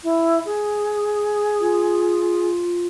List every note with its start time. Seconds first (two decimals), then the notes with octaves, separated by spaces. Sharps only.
0.03 E4
0.45 G#4
1.60 F4